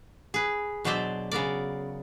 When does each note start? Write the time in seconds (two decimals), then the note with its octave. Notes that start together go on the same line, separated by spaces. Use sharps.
0.34 G#4 B4
0.85 B2 F#3 D4 C5 D5 E5
1.31 C#3 B3 A#4 D5